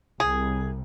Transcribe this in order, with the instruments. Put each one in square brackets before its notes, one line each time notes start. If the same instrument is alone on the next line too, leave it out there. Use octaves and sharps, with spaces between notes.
[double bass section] C2 [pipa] G#4